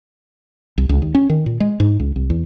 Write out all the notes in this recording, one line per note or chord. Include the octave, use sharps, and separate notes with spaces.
C2
C#2
D#2
C#4
D#3
A#2
G#3
G#2
C#2
C2
E2